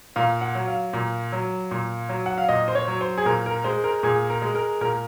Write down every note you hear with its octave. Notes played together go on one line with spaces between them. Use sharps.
A#2 F5
F#5
F#3
F5
A#2
F#3
A#2
F#3
F#5
F5
A#2 D#5
C5
C#5
F#3
C5
G#4
A#2 A#4
A#4
G#3 C5
A#4
A#2 G#4
A#4
G#3
A#4
A#2 A#4